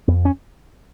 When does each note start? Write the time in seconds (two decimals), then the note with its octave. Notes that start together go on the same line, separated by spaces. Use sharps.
0.08 F2 B3
0.25 C#4